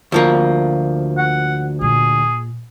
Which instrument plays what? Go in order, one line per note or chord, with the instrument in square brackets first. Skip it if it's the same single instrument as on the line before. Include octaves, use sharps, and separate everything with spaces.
[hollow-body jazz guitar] D2 F3 A#3
[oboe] F#5
[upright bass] A#2 [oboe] G#4